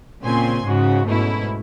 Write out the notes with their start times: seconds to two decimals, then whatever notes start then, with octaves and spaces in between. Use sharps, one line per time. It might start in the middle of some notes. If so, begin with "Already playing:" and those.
0.23 A#2 C#3 C4 G#5 C6
0.64 G#2 C#3 F#4
1.06 G#2 B2 A3 C#4 E4